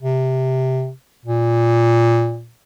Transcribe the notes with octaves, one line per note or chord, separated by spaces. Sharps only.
C3
A#2